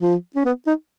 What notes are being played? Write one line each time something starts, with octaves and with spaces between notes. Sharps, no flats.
F3
C#4
B3
D#4